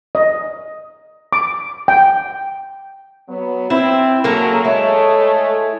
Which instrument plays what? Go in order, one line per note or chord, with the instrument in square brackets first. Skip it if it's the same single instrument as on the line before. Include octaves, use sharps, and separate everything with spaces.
[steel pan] D#5
D6
G5
[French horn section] F#3 B3
[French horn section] C4 [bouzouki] E4 [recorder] C5
[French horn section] C#3 F#3 [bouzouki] A#3 A4 A#4 [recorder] F5
[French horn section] G#3 A3 [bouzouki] E4 [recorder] C#5